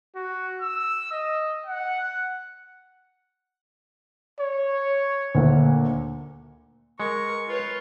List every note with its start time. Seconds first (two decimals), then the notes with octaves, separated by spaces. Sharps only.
0.15 F#4
0.61 E6
1.12 D#5
1.66 F#5
4.39 C#5
5.35 D2 A#2 D3
7.00 G#3 A#4 C#6
7.48 F4 B4 C#5